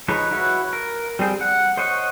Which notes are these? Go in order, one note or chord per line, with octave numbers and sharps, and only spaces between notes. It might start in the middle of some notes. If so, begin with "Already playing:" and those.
F3 G#3 D#4 B4 C#5
E4 F#4 B4 C#5
A#4
G3 C4 G#4
F#5
C5 C#5 D#5 F#5 C#6